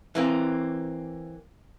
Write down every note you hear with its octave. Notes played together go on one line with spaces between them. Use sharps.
E3 A#3 C4